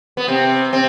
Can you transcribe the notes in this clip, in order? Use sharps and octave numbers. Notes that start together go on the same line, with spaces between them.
B3
C3 C4
C3 C4